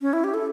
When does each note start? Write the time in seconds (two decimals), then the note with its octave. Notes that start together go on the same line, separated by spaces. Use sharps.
0.02 C#4
0.13 E4
0.24 G4
0.34 A4